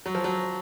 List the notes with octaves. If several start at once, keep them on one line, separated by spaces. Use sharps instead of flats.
F#3
F3
F#3